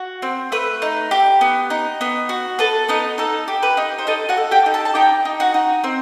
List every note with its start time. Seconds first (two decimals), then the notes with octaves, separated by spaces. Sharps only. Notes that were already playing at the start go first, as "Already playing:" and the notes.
Already playing: F#4
0.22 C4
0.52 A3 B4
0.82 D#4
1.11 G4
1.41 B3
1.70 D#4
2.01 B3
2.29 F#4
2.59 A4 B4
2.88 B3 D#4 D#5
3.18 D#4 A4
3.48 G4
3.63 B4
3.77 D#4
3.98 C5
4.07 D#4 A4 D#5
4.29 F#4 F#5
4.37 A4
4.51 G4 G5
4.66 D#4
4.74 A4 A5
4.85 A5
4.95 D#4 G4 G5
5.25 D#4
5.40 F#4 F#5
5.54 D#4
5.84 C4